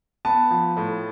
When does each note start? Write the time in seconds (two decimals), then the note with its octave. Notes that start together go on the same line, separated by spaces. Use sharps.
0.25 B3 A5
0.51 F3
0.77 A2